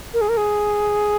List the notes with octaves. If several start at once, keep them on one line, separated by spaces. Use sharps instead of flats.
A#4
G#4
A#4
G#4